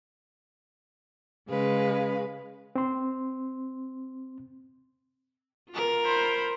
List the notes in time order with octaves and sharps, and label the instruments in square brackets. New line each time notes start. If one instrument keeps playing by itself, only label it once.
[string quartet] C#3 G#3 B4 F5
[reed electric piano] C4 C6
[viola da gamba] F4 A#4
[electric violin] C5 B5